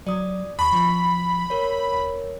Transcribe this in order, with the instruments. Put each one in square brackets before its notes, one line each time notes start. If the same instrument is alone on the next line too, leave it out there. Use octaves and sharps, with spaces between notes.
[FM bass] F#3 [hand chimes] D5 D#6
[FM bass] D#2 [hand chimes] A5 C#6 B6 [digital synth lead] B5
[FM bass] F3 [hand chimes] C6
[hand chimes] A#4 C#5
[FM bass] D#1